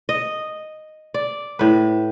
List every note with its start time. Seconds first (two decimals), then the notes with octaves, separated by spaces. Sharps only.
0.09 D#5
1.14 D5
1.59 A2 B4